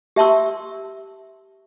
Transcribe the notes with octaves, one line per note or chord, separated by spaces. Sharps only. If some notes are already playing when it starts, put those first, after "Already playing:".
G4 E5 A5 C6 C#6 E6